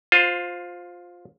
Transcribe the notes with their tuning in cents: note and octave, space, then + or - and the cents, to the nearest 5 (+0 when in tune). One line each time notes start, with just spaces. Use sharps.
F4 +15 C5 +0